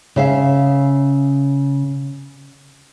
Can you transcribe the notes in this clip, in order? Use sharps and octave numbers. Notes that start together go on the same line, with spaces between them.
C#3 E5 F5